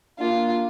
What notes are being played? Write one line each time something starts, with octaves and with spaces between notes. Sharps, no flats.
A#3 D4 F4